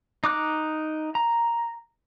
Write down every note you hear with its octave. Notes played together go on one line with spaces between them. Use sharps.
D#4 D6 F#6
A#5